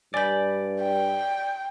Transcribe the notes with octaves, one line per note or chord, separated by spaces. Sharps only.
G2 D5 G#5 B5 G6
G5